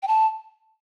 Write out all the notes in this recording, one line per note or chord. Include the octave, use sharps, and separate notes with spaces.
G5
A5